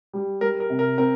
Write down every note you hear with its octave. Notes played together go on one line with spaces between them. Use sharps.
G3
G3 A#4
A#4
C3
A#4
C4 A#4